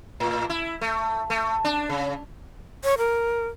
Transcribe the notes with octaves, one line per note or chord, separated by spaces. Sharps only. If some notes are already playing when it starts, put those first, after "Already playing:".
A2
E4
A3
A3
D4
C#3
C#5
A#4